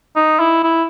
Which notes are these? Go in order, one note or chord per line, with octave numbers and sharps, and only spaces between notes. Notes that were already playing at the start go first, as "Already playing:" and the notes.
D#4
E4
E4